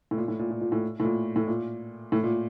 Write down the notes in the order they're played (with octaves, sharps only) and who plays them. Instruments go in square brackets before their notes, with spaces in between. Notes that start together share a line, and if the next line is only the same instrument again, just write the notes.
[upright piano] A2
A#2
A2
A#2
A#2
A#2
A2
A2
A#2
A2
A#2
A2
A#2